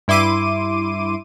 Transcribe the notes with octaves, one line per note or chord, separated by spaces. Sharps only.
G2 E4 C6 D6 D#7